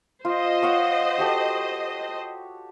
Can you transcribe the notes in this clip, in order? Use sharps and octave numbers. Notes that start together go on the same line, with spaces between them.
F4 C5 D#5
C#5 F5 F#5
F#4 G4 A4